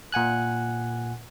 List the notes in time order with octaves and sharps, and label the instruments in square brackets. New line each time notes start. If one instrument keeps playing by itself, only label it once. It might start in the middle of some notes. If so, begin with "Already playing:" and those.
[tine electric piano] A#2 F#5 G#5 F#6